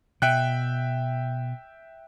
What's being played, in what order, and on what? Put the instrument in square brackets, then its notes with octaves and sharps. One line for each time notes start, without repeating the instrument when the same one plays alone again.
[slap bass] B2 [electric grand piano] E5 G5 F#6